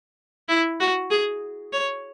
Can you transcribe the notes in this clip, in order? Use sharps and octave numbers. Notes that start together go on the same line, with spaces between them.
E4
F#4
G#4
C#5